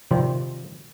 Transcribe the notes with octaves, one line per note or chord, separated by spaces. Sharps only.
C3 D#3 F3 C4 C5 D5